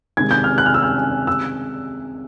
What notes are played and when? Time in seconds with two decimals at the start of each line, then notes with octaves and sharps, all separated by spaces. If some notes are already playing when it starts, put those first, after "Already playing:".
0.17 C3 D#3 G#3 G#6
0.31 G6
0.44 F6
0.58 F#6
0.66 F6
0.74 E6
0.82 F6
1.27 E6